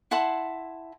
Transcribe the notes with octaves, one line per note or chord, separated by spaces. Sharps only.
E4 F#5 A5 C6